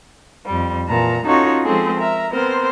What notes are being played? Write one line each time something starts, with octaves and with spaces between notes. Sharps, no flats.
F2 G3
A#2 E3 A5 A#5
C#4 D#4 F4 F#4 A4 C#5
F3 G#3 C4 G#4 A4
A#4 E5 A#5
B3 C4 A#4 C5